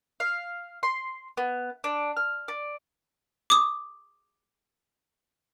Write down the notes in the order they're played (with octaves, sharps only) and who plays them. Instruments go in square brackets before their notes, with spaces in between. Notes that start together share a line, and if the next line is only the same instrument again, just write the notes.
[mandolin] F5
C6
B3
D4
F6
D5
[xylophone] D6 D#6